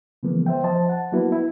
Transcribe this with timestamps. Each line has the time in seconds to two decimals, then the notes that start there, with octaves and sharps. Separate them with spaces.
0.23 C#3 E3 F3 G#3 A#3 B3
0.46 C5 E5 G5
0.64 F3 C5 D#5 A5
0.89 F#5 A5
1.12 F#3 A#3 B3 E4 F#4 B4
1.32 E4